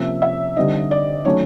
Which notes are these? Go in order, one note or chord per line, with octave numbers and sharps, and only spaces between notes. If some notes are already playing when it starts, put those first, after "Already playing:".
Already playing: C3 F3 A#3 C#4 E5
E5
D3 G3 C4 D#4 D#5
D5
D#3 F#3 A3 C#4 C#5